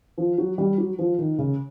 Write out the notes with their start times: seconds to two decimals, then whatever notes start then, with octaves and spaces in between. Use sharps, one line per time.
0.18 F3
0.38 F#3
0.58 G3
0.78 F#3
0.99 F3
1.19 D#3
1.38 C#3